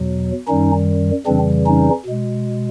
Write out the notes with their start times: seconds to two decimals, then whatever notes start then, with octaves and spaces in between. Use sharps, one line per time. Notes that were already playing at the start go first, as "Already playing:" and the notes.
Already playing: E2 B2 F#3
0.47 F#2 D#3 G3 C#4 D#4
1.26 F2 C#3 E3 G3 C4 D4
1.66 C#4 D#4
2.06 B2 G#3